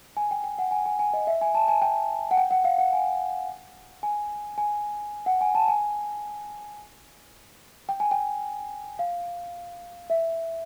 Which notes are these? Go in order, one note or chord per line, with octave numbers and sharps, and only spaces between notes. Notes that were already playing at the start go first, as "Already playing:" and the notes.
G#5
G5
G5
F#5
G#5
G#5
G#5
D#5
E5
G#5
A5
G#5
G5
F#5
G5
F#5
F5
F#5
G#5
G#5
G#5
F#5
G#5
A5
G#5
G5
G#5
G5
F5
E5